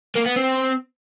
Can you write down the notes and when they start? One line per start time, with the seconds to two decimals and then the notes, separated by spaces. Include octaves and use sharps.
0.15 A#3
0.26 B3
0.36 C4